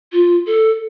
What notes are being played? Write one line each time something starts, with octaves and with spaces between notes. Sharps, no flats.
F4
A4